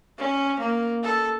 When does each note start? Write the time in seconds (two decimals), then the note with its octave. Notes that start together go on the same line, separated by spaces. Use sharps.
0.18 C#4
0.60 A#3
1.03 A4